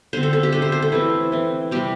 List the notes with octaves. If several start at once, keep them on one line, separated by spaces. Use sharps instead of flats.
D3 C4 C5
A4
A4
G4
D3 A3 D4 A4
C5
C5
A4
E3 A3 C4 E4
E3 C4
C3 G3 C4 G4